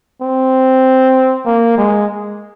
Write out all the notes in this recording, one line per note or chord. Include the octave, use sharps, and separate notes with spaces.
C4
A#3
G#3